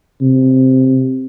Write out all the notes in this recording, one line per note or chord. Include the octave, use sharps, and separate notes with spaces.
C3